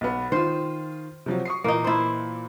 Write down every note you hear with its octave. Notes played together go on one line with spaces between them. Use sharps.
B1 B3
D#3 F4 C5
C3 F3 F#3
C#6 D#6 C7
A#2 E3 A#3 D#4
E4 C5